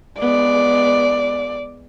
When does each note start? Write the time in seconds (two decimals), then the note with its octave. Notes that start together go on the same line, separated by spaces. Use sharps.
0.19 G#3 B3 D5